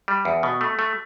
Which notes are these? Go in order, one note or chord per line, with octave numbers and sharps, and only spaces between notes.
G3
E2
B2
A3
A3